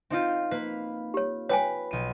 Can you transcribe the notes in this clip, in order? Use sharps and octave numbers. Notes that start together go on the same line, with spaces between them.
C4 D#4 F4
A#3 B4
G4 C#5
B4 C#5 G5 G#5
B1 D#7